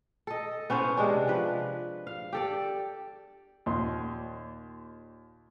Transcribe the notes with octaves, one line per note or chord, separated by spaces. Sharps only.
A4 D#5
B3 C#4 E4 C5
C3 G#3 D4
F3 B4
F5
G4 A4 D5
D#2 A#2 C6